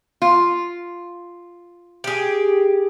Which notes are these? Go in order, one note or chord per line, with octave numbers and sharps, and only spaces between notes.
F4
G4 G#4